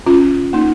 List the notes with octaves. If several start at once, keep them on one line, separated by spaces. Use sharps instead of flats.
C#4 F4
A#3 D#4